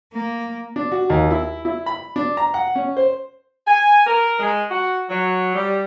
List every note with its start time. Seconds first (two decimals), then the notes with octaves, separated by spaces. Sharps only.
0.13 A#3
0.76 D4
0.92 F#4
1.10 D#2
1.31 E4
1.65 E4
1.86 B5
2.16 D4
2.37 A#5
2.54 F#5
2.75 C#4
2.97 C5
3.67 G#5
4.06 A#4
4.40 G#3
4.71 F#4
5.10 F#3
5.55 G3